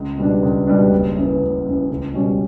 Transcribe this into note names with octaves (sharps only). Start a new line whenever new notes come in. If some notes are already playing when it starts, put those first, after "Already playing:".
Already playing: C#2
B2 G3 B3 D4
C#2
B2 G3 B3 D4
F#1
F#2 E3 B3
F#1
F#2 E3 B3
C#2
B2 G3 C#4